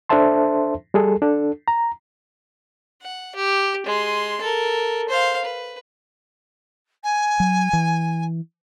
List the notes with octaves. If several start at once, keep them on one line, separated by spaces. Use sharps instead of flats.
D4 A4 C5 E5 A5 C6
G3 G#4 A4
D4 A4
A#5
F#5
G4
G#3 C6
A4 A#4
C5 F5
B4
G#5
F#3
E3